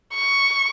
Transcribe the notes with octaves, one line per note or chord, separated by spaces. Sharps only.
C#6